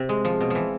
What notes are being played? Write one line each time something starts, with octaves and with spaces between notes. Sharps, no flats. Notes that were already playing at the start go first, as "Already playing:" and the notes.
Already playing: C3
G#3
F3
B2
E3 F3